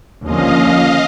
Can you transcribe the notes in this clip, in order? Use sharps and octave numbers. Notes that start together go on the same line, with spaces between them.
D#2 D3 F3 A#3 C#4 D#5 F5